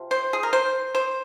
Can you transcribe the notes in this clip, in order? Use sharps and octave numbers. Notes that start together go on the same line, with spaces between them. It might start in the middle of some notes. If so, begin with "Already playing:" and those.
Already playing: C3 F3
C5
G#4
A#4
C5
C5